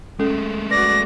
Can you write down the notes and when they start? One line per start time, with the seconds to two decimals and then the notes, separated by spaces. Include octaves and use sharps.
0.20 G#3 A3 C#4 A4
0.71 F#4 B4 D5 A#6